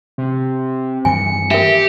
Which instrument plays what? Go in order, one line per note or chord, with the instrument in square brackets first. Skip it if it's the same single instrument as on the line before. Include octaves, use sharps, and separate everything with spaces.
[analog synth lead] C3
[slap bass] G2 D#3 E3 [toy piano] G#5 [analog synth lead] C#7
[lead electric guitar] G4 [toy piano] A#4 E5